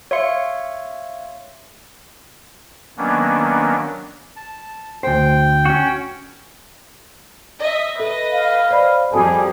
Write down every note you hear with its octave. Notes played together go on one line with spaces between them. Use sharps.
C#5 E5 F5 C6 C#7
D#3 F#3 A#3 B3 C#4 D4
A5
D2 C5 G5
C#4 F#4
D#5 E5
A4 B4 D#5
F5
C5 D5 B5
F2 G3 F#4 G#4 A4 A5